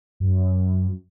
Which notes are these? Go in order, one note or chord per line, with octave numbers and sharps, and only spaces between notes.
F#2